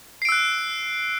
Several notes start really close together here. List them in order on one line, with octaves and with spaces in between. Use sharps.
C7 D7 E6 F#6